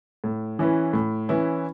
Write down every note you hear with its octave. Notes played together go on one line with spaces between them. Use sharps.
A2
E3 C#4 E4 B4
A2
E3 C#4 E4 B4